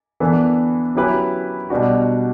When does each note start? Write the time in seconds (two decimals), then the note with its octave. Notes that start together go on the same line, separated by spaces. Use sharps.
0.20 E3 B3 D4 A4
0.95 F#3 C#4 E4 G4 B4
1.70 B2 G3 D4 F#4